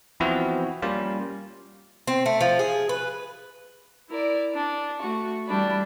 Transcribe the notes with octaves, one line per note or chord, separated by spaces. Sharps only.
E3 F3 B3 C4 E4 F#4
G3 A#3 C#4 F4
C4
A3
F3
G#4
B4
E4 A#4 D5
D4
A3 F#4 C#6
E3 G3 D4 B5